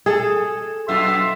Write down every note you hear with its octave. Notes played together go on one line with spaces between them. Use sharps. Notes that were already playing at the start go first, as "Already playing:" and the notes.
G#4 A4
F#2 B2 F4 E5